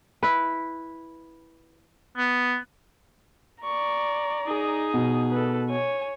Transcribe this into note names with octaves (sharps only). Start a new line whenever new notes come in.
E4 B4
B3
D5 A#5 C#6
D#4 G#4
B2
A4 B4
C#5 G#5